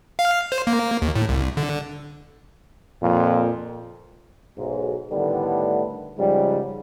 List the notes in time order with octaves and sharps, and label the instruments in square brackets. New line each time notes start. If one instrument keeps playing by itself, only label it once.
[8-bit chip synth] F5
C5
A#3
D#2
A2
C2
D3
[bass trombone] F2 [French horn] A#2
[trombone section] B1 G#2
A2 D3 D#3 G3 A3 B3
G#2 C#3 F3 G3